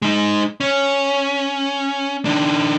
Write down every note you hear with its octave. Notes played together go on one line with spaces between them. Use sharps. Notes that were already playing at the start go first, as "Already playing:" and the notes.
G#3 D#4
C#4
D#3 D4